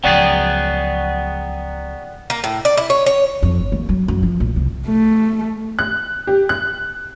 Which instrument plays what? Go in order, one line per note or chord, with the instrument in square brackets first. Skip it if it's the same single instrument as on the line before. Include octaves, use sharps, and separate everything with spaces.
[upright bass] C#2 F3 [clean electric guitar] F#3 B3 G#4 [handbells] D5 F#5 G5
[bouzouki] A#3
A2
D5
E4
C#5
C#5
[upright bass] F2
G1
D#2
F#3
F#2
F3
A#1
C2
[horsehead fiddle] A3
[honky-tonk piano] F#6
G4
F#6